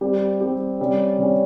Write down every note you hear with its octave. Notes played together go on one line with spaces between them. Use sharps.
G3 C4 G4
G3 C4 G4
C3 G3 C#4
C3 G3 C#4